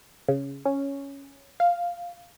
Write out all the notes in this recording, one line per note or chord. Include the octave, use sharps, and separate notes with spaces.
C#3
C#4
F5